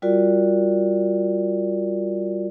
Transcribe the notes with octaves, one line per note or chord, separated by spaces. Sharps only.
G3 F4 F#4 A#4 D5